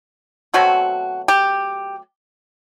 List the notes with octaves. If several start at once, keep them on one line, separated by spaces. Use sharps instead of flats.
B2 F#3 A3 C4 F#4
G4